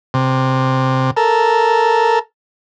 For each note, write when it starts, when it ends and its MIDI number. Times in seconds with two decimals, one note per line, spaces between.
0.14 1.11 48
1.17 2.19 69
1.17 2.19 70